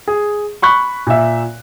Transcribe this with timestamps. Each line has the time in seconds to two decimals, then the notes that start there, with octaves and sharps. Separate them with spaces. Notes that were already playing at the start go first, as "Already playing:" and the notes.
0.08 G#4
0.62 B5 C#6 F#6
1.07 A#2 E5